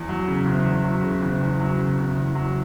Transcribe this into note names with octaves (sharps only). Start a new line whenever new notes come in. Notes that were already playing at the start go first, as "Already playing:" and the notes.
Already playing: E2
F#3
C#3
F#1
E2
F#3
C#3
F#1
E2
F#3
C#3
F#1
E2
F#3